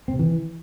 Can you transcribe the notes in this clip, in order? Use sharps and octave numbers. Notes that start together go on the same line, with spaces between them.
C4
C3
E3